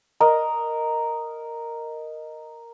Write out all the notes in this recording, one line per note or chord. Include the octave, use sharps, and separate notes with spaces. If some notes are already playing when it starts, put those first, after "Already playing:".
A#4 D#5